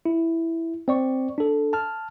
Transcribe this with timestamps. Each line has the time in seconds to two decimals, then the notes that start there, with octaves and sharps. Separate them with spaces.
0.06 E4
0.88 C4 D5 C#6
1.38 D4 A4
1.73 A5 F6